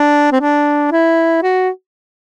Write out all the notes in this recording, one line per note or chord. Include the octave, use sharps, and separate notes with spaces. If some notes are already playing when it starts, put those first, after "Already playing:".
Already playing: D4
C4
D4
E4
F#4